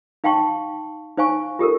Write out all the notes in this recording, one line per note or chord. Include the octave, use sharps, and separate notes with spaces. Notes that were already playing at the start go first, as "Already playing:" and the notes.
D#4 F5 G5 A5 C6 C#6
D#4 C5 F5 G#5 C#6
F4 G4 A4 A#4